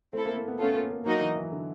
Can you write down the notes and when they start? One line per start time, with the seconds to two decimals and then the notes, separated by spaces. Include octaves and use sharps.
0.13 A3 C4 E4 A4
0.25 A#3
0.37 A#3
0.48 B3
0.59 A3 B3 C#4 F4 A4
0.75 A#3
0.90 A#3
1.05 F#3 A#3 D#4 F#4 A#4 D#5
1.21 E3
1.36 E3
1.52 D3